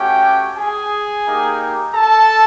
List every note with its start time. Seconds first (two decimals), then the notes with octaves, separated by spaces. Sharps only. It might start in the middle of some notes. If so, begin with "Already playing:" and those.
Already playing: A3 C#4 F#4 G4 G5
0.58 G#4 G#5
1.26 A#3 D#4 G4
1.93 A4 A5